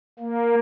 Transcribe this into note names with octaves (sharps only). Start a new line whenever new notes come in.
A#3